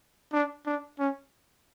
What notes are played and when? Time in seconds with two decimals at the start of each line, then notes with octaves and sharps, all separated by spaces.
0.33 D4
0.66 D4
0.99 C#4